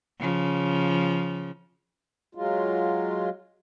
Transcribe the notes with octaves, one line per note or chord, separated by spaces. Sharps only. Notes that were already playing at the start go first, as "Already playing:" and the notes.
C#3 F3
F#3 G#3 F4